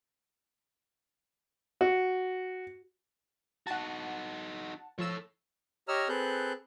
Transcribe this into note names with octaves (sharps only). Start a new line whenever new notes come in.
F#4
D#4 F#4 F#5 A5
F3 A4 C#5 E6
G4 C#5 D#5 A#5 E6 F6
C4 G#4 A4 B4 F#6 G6